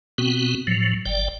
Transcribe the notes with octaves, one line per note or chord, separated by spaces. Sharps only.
B2 B3 C4 F#4
A2 F3 F#3
G1 D5 G5